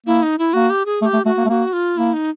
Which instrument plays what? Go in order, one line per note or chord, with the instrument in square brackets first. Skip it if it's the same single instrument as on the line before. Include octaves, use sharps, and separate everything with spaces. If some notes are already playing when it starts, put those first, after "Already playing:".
[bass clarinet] A#3 [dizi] E4
[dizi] D#4
E4
[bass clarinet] A#3 [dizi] F#4
[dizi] G4
G#4
[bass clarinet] A3 [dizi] G#4
[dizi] G4
[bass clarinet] A3
[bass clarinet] A3 [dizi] F#4
[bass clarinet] A#3
A3
[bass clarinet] A#3 [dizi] F#4
[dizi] F4
[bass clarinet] A#3 [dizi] E4
[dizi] D#4